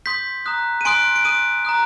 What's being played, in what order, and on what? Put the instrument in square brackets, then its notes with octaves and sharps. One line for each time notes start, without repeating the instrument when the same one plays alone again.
[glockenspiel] C6 D#6 G6 B6
A#5 D#6 F#6
D#7
G#5 C6 D#6 F#6 D7
D7
C6 D#6 F#6 D#7
A#5 D#6 F#6